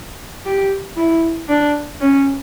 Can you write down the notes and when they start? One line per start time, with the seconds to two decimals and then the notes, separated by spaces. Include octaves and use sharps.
0.46 G4
0.97 E4
1.49 D4
2.01 C#4